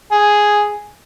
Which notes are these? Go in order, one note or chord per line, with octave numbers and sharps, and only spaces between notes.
G#4